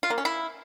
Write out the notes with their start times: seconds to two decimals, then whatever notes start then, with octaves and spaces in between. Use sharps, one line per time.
0.03 F4
0.10 A#3
0.18 C#4
0.25 E4